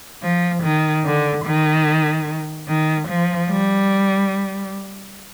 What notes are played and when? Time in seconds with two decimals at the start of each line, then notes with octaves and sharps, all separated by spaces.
0.23 F3
0.63 D#3
1.05 D3
1.45 D#3
2.68 D#3
3.09 F3
3.50 G3